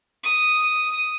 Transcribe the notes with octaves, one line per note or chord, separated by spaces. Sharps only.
D#6